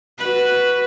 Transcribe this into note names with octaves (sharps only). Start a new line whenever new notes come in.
F#4 B4